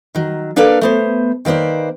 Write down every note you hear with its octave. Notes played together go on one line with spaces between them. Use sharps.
D#3 F#3
A#3 D4 A4 B4 D5 F5
A3 B3 C5
D#3 A#3 B4 C5 D5